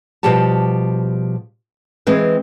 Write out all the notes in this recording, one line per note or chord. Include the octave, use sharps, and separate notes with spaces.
B2 F3 G3 G4 F#5 A5
E3 G#3 C4 B4